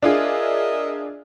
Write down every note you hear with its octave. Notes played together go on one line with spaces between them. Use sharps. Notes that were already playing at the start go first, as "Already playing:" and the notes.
D4 F4 G#4 A#4 D#5 E5